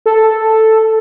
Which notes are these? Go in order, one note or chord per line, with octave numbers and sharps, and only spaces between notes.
A4